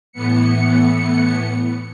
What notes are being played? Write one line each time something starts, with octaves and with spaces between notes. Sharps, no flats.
A2 E3 B3 C#7